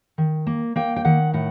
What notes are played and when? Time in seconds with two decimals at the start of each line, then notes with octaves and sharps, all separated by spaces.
0.18 D#3
0.47 A#3
0.76 A#3 G5
0.96 G5
1.05 D#3 F#5
1.33 A2 F#5